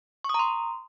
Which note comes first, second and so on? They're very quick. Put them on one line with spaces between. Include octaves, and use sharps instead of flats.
C#6 D#6 A#5 C6